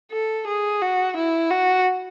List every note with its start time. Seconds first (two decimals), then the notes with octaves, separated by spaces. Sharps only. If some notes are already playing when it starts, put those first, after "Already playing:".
0.11 A4
0.47 G#4
0.82 F#4
1.17 E4
1.50 F#4